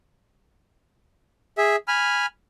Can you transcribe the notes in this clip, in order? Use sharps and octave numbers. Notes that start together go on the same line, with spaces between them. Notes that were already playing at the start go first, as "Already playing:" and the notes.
G#4 E5
G#5 B5 F6